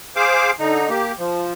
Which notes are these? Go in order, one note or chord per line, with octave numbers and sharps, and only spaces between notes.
G#4 C5 F5 D6
D3 D#4
A#3 G4
F3